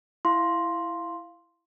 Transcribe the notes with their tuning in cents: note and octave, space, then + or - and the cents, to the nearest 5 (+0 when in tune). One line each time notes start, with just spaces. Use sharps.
E4 +10 F5 +0 C6 +5